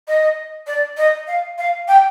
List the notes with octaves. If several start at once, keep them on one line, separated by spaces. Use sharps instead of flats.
D#5
D5
D#5
F5
F5
G5